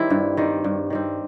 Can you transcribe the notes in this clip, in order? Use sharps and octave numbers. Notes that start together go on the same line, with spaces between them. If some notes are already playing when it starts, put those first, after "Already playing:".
Already playing: D#3 G3 C4 E4
G2
D#3 G3 C4
G2
D#3 G3 C4